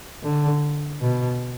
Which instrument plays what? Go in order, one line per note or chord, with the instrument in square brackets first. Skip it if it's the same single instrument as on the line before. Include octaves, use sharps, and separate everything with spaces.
[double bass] D3
B2